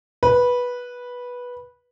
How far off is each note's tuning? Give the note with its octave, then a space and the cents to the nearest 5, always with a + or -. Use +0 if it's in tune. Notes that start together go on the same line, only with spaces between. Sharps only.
B4 -10